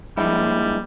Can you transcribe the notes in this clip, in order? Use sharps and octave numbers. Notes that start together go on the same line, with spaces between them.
G2 F3 G3 G#3 A#3 E4